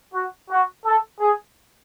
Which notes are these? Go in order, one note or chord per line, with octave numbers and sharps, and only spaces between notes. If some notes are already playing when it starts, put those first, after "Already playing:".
F#4
F#4
A4
G#4